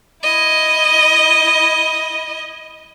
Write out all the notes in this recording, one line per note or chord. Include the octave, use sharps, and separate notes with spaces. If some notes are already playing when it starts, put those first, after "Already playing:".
E4 D#5